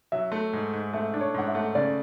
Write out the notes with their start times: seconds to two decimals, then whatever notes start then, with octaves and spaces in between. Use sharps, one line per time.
0.12 F#3 E5
0.32 A3
0.53 G#2
0.73 G#2
0.93 A3 E5
1.14 D4
1.21 C#5
1.34 G#2 F#5
1.48 E5
1.55 A3
1.75 C#3 D5